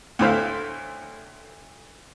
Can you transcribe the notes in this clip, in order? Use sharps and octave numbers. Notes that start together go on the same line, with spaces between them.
D2 A2 E4 C5 F5